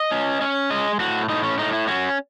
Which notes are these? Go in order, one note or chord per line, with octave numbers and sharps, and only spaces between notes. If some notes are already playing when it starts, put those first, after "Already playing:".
Already playing: D#5
C#4
C#4
G#3 D#5
A2 F#4
A2 D#4
C#4
A2 D#4
E4
C#4 F#4